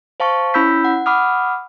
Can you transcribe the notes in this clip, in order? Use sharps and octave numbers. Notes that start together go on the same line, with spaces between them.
C5 F5 A5 C#6
C#4 E4 B5 E6 G6 B6
F#5
F#5 B5 D6 D#6 F6